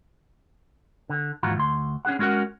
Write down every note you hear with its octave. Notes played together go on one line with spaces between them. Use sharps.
D3
D#2 G#2 E3 F4 F#4 A#5
D2 C6
C#4 D4 G#4 F#5
G#3 C#4 F#4 A#4 F#5